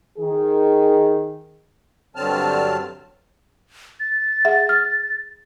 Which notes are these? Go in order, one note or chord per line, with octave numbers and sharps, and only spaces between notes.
D#3 G#4
G2 D3 F#3 C4 A5 F6
A6
G#4 E5 F#5
F6